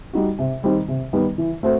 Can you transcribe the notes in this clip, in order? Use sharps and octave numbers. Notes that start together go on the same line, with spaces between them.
G3 D#4 F#4
C3
D#3 G3 C4
C3
D#3 G3 B3
E3
A3 C4 F#4 C5